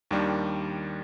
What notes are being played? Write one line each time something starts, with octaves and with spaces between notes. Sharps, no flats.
D#2 D#3 G3 D4